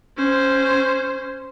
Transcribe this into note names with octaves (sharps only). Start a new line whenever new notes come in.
C#4 C5